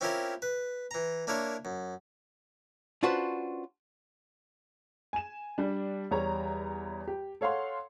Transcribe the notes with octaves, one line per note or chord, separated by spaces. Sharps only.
C4 C#4 E4 F4 G4 A#4
B4
E3 A#5
A#3 D4 E4 A#4 C#5
F#2
C#4 D4 F4 F#4 B4 C5
G#5 E7
G3 D4
E2 G3 C#5 A#5
G4
A4 C#5 F5 F#5 C6